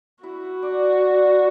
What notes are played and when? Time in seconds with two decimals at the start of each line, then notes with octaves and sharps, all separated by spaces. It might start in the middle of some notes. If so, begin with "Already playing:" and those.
0.23 E4 F#4 E5
0.62 D4 D5
0.92 C5
1.01 D4 D5